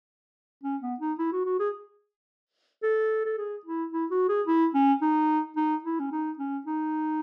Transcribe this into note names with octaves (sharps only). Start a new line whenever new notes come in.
C#4
B3
D#4
E4
F#4
F#4
G#4
A4
A4
G#4
E4
E4
F#4
G#4
E4
C#4
D#4
D#4
E4
C#4
D#4
C#4
D#4